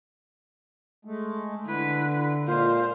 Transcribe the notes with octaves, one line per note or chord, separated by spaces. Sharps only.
G#3 A3
D3 E4 B4
A#2 G#3 C5 F5